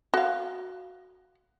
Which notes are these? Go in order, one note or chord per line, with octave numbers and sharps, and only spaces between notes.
F#4 F5